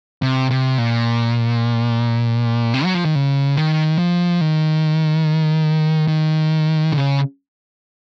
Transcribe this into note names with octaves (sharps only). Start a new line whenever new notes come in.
C3
C3
A#2
C3
F#3
F3
D#3
C#3
D#3
F3
D#3
D#3
C#3